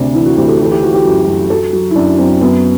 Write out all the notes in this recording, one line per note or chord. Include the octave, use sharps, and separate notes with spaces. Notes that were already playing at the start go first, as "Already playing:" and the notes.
Already playing: D2 C3 D4
E3 E4
F#4
D2 G4
A4
E3 G4
A4
G4
E3 F#4
G4
F#2
F#2
F#3 A4
F#3
E4
F#2 D4
F#2 C4
F#2 B3